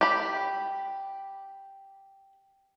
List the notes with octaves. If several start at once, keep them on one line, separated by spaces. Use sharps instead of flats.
G4 B5